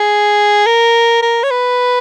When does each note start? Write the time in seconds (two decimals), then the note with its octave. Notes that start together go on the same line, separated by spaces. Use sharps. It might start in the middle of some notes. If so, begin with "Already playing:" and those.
Already playing: G#4
0.66 A#4
1.22 A#4
1.43 C#5
1.51 B4